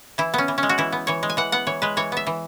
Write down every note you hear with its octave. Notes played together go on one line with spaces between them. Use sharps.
E3 E4
B3 C#4
E3
C#4
G#3
F#4
E3 E4
B3
E3 C#5
G#3
G#5
E3 F#5
B3 F#5
E3 C#5
G#3 B4
E3 C#5
B3 E5
E3